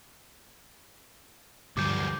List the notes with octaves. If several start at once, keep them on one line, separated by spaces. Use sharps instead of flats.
D2 G2 D3 F3 F#3 D6 G6